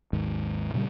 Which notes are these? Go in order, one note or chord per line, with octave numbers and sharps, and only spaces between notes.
G#1 D#2 G#2
A#2 C#3 F#3 G3